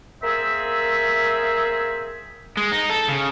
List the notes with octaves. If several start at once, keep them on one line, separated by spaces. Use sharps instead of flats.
A#3 C4 G#4 E5
G#3
D#4
A4
C#3